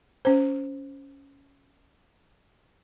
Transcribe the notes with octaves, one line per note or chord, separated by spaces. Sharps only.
C#4 C5